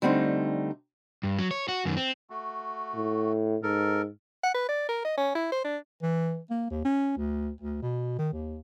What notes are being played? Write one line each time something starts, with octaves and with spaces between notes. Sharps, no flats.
D3 G3 A3 C4 D4 D#4
G2
F#3
C#5
F#4
F#2 D#3
C4
A3 F#4
A2
G#2 A4 A#4
F#5
B4
D5
A#4
D#5
C#4
E4
C5
D4
E3
A#3
D#2
C#4
D2
D2
B2
D#3
D#2